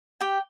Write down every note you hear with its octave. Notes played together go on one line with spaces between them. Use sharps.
G4 G5